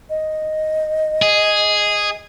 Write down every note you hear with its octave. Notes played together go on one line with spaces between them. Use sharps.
D#5
G#4